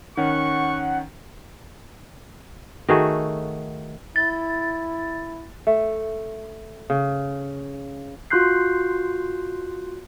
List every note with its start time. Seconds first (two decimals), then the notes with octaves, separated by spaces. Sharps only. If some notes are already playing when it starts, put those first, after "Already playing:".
0.17 D#3 C#4 F#5 C#6
2.88 D#3 A3 F#4 G#4
4.16 E4 A6
5.67 A3
6.90 C#3
8.30 F4 F#4 C6 F#6 G6 C7